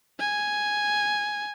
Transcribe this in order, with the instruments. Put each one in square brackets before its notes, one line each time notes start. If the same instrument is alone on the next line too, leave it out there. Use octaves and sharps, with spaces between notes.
[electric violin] G#5